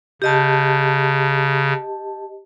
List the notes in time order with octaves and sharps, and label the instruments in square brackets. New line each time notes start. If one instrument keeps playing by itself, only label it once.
[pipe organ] C#3 [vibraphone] G4 D#5 A5